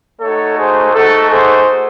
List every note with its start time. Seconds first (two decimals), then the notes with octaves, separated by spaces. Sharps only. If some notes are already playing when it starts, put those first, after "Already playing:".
0.20 A3 D#4 F#4 A4 C#5
0.58 G#4 C5
0.94 A3 D#4 F#4 A4
1.30 G#4 C5